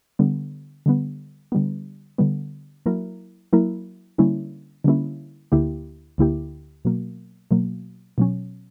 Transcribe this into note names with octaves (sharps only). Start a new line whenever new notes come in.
D3 G3 B3
D3 G3 B3
D3 G3 B3
D3 G3 B3
F#3 A#3 E4 A#4
F#3 A#3 E4 A#4
D3 G3 A#3 C#4 E4
D3 G3 A#3 C#4 E4
D2 D3 A#3 E4 G4
D2 D3 A#3 E4 G4
B2 F#3 A#3
B2 F#3 A#3
B2 F#3 C#4